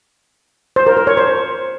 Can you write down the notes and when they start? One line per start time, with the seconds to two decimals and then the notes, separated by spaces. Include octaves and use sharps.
0.76 C5
0.87 A#4
0.97 A#4
1.07 C#5
1.17 C5